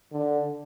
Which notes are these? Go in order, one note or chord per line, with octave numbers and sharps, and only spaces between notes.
D3